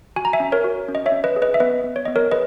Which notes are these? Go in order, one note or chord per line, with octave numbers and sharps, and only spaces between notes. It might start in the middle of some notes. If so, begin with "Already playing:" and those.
F#4 G#5
A#5
E5 G#5
C#4
A#4 C#5
F#4
C#4
D#5
C#5 E5
C#4
B4 D#5
G#4
B4 D#5
E5
B3 B4 D#5
B3
C#5
B3 D#5
A#4 C#5
G#4 B4 D#5